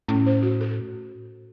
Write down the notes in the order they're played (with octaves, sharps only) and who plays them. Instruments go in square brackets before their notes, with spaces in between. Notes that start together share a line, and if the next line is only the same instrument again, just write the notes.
[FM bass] A2 [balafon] C#4
[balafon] C5
F#4
A4